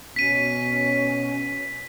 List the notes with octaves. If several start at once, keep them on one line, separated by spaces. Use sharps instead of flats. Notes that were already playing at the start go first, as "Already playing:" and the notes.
B2 C#4 B6 D#7